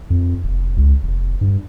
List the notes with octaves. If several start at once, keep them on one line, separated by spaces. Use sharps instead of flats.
F2
F1
C#2
F1
G2